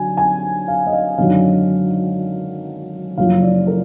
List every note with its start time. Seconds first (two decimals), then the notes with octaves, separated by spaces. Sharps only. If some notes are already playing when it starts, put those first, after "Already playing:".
Already playing: D3 F#3 G#5
0.17 G#5
0.68 F5
0.87 D#5
0.93 F5
1.18 G#1 F#2 D3 F#3 F5
3.18 F#1 F#2 F3 F5
3.42 D5
3.67 A#4